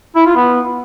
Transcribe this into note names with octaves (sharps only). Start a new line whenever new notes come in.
E4
F4
B3